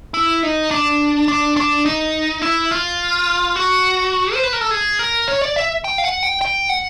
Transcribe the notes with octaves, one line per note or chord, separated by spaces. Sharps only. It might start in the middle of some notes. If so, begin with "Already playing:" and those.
E4
D#4
D4
D4
D4
D#4
E4
F4
F#4
C5
B4
A#4
A4
G#4
A#4
C#5
D5
E5
G5
F5
F#5
G5
G5
F#5